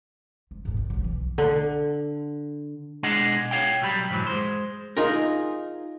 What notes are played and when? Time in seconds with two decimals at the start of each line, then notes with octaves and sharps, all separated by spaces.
0.51 F2
0.65 D#2 G#2
0.77 A1
0.90 B1 F#3
1.04 E3
1.38 D3
3.03 B2 G#3 D4 G#4 D#5 F#5
3.51 C#5 F5 G5
3.82 B1 F#3 G3 B5
4.10 F2 G#2 D3 E3 F#3
4.27 G#3 C5
4.97 D#4 F4 G#4 A#4